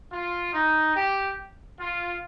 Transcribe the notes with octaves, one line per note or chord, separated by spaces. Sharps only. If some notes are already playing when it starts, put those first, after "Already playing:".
F4
D#4
G4
F4